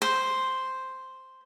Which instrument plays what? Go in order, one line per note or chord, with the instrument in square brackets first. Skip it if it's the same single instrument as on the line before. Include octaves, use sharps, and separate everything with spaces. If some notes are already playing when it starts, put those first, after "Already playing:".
[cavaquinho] C5